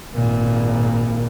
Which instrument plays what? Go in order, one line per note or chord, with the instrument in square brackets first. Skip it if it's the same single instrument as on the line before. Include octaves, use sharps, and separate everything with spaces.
[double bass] G#1 A#2